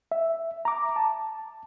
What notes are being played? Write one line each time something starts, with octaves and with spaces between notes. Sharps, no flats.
E5
A#5 D6
A5